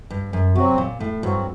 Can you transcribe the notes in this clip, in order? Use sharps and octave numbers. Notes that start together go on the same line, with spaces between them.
G2
F#2
C3 F#3 C4 F#4
A#2
A2
G2 F#3 C4 F#4